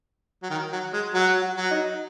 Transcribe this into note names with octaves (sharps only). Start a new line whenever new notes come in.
F#3
D#3
F#3
G#3
F#3 F#4
F#4
F#3
D#4